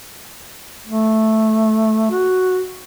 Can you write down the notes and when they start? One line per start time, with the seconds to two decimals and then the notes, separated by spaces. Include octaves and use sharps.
0.87 A3
2.11 F#4